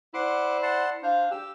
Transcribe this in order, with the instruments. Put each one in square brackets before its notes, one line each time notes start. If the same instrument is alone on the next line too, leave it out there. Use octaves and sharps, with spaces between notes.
[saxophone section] E4 C5 D5 [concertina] F#5 C6 D6
[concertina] F#5 A5 C6
[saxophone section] D4 F5 [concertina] C5
[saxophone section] G4 [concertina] E6